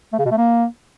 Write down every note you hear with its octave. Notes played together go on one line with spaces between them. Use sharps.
A3
C#3
B2
A3
A#3